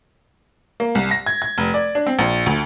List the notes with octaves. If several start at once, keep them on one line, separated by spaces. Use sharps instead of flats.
A#3
C2
A#6
G#6
G#6
F1
D5
D4
C4
A#1
D2